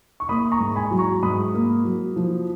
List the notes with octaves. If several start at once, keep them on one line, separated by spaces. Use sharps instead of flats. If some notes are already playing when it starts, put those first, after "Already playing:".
C#6
A#3 B5 D#6
A#5 C#6
G#2
G#5 B5
F#3
A#5 C#6
G#2 B5 D#6
A#3
F#3
F3